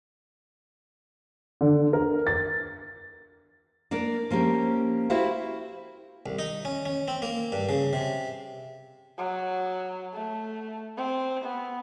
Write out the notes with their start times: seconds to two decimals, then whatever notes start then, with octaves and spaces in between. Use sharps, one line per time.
1.61 D3
1.93 A#4
2.27 A6
3.91 A#3 D4 A#4 D5
4.30 F3 A#3 C#4 G4
5.10 E4 F#4 G4 C5 E5 F5
6.26 C2
6.39 D#4
6.65 C#4
6.86 C#4
7.08 C4
7.22 A#3
7.52 G2
7.69 C#3
7.93 C3
9.18 F#3
10.14 A3
10.97 C4
11.45 B3